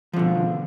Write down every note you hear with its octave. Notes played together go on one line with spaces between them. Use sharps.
B2 D3 F3